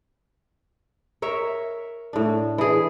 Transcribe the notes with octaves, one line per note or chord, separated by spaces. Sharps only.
A#4 C#5 E5
A2 D4
E3 G#4